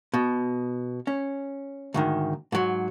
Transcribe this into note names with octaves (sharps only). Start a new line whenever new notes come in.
B2
C#4
D2 G#2 D#3
G#2 F#3